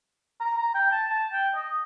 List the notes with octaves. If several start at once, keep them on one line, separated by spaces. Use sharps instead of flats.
A#5
A#5
G5
A5
A5
G5
D#5